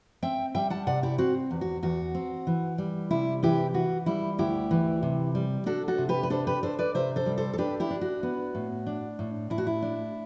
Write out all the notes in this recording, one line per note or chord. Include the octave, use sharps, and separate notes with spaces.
C4 E5 G5
G3 E5 G5
F#5 A5
C3 D5 F#5
E4 G4
C4 F#4
E2
F#4
E2 F#4
C4
E3
G3
C3 E4
E3 E4 G4
E3 F#4
G3 E4
D2 E4 G4
E3
C3
G3
D4 F#4 A4
F#4 A4
C3
G4 B4
B4
D4 A4 C5
G4 B4
D4 A4 C5
B4 D5
C3 C5 E5
A4 C5
G3
A4 C5
A4
D4 G4 B4
E4 G4
D4
F#4
B3
A2
D4
A2
A2 E4
F#4
E4
D4